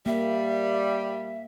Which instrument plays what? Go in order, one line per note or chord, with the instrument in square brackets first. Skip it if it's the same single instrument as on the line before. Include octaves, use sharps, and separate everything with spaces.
[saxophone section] G3 [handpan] A#3 [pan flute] E5